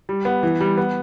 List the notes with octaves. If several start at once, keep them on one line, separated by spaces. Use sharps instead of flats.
G3
B3
E3
G3
B3